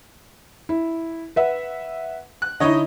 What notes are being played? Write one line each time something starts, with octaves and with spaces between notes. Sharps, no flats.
E4
B4 E5 F#5
F#6
D3 D#4 E4 C#5 D#5